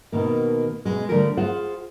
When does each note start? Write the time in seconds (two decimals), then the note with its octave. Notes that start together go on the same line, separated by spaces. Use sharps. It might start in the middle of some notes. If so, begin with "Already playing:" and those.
0.12 B2 D#3 A#3
0.85 B2 G#3
1.09 D3 F3 G3 A3 G4 A#4
1.37 F4 G#4 C5 F5 F#5